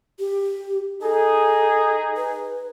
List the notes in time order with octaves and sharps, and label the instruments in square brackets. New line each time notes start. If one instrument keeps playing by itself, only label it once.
[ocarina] G4
[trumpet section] D#4 G#4 [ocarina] A4
[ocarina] B4